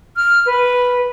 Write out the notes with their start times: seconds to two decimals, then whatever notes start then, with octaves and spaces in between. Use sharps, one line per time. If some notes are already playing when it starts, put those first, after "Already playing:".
0.16 F6
0.46 B4